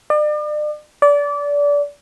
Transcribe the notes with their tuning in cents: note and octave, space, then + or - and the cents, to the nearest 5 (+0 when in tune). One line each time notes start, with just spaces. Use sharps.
D5 +40
D5 -25